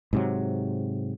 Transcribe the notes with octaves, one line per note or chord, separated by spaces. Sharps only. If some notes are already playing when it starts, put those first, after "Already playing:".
G#2 C3 F#3